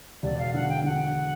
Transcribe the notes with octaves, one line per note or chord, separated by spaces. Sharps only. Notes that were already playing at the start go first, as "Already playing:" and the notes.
E1 D5
F5
D3 F#5
G5
D3 F#5